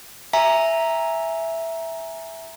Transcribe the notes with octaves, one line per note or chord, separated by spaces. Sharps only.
E5 G#5 A#5